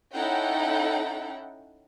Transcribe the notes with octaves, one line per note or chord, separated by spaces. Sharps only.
C#4 D#4 E4 A4 F#5 G5